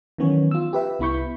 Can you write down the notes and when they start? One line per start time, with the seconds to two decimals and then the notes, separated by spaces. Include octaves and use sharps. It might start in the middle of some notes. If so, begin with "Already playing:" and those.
0.18 D#3 E3 F#3 B3 C#4 C#5
0.51 F4 E6
0.73 G4 B4 E5
0.99 C2 B3 E4 B5 C#6 G6